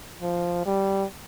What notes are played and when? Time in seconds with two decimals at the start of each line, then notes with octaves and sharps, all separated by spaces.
0.22 F3
0.66 G3